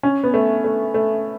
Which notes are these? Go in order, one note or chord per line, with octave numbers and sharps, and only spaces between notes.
C#4
B3
A3
A3
A3